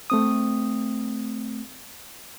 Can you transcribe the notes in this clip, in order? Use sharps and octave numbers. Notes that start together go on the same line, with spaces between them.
A3 C4 D#6